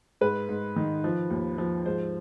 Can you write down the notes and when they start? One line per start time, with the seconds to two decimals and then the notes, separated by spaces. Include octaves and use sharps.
0.21 G#2 B4
0.49 G#2
0.76 D#3
1.04 F3
1.30 D#2
1.58 F3
1.86 G#2 C5